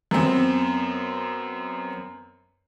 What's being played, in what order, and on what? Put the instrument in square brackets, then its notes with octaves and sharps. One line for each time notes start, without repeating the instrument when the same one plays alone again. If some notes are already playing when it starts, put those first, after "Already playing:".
[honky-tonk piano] F#2 B3 C4